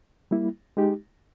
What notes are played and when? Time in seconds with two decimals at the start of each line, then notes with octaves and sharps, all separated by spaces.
0.31 G3 A#3 E4
0.77 G#3 D#4 G4